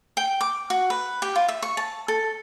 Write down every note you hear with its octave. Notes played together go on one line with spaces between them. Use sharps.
G5
D6
F#4
B4
G4
F4
E5
C#6
A5
A4